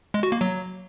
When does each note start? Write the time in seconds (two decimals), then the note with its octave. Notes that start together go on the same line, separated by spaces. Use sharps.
0.14 G#3
0.23 F#4
0.32 A#3
0.41 F#3